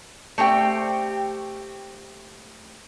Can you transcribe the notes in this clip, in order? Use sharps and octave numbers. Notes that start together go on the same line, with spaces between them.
A3 C4 G4 G5